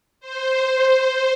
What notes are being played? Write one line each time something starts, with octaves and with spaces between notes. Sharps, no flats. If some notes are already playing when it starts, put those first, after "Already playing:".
C5